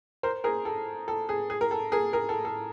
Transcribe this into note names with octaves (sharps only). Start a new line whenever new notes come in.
A#4 C5
G#4 A#4
A4
A4
G#4
G#4
A#4
A4
G#4 A#4
G#4 A#4
A4
A4